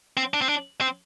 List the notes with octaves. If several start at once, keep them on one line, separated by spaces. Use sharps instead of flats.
C4
D4
C4
D4
C4